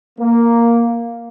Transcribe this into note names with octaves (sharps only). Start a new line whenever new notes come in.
A#3